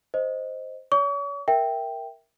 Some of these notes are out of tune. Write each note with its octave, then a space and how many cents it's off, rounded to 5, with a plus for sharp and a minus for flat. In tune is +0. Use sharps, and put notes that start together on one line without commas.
C5 +0 D#5 +0
C#5 +35 C#6 +40
A#4 +0 E5 +0 G5 +0